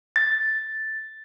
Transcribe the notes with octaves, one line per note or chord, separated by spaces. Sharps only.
A6